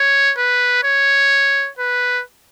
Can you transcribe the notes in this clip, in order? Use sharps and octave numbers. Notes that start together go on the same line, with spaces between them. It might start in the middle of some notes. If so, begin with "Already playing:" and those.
Already playing: C#5
B4
C#5
B4